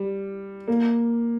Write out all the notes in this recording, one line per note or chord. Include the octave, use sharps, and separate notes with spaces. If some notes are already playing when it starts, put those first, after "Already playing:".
Already playing: G3
A#3